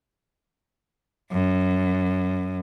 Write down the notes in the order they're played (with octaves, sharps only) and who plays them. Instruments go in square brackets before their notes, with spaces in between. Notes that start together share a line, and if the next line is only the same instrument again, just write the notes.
[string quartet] F#2